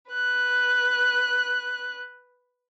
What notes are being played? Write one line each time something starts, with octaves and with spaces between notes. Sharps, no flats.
B4 F#6